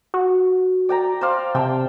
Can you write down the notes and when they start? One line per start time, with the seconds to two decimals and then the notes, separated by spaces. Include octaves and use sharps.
0.14 F#4
0.89 D5 G5 A#5
1.21 C5 D5 F5
1.55 C3 G5 A5